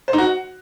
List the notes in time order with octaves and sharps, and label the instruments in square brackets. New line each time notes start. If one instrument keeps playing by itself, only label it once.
[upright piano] C5
D#4
F#4